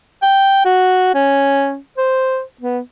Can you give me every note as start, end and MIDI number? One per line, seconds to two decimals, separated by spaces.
0.22 0.65 79
0.65 1.10 66
1.15 1.77 61
1.97 2.42 72
2.61 2.79 59